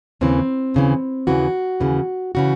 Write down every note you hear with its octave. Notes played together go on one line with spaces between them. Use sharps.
D#2 C#3 E3 C4
D#2 C#3 E3
D#2 C#3 E3 F#4
D#2 C#3 E3
C#3 E3 F#4